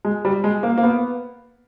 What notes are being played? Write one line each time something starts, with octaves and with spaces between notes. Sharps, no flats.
G#3
G3
G#3
A#3
A#3
B3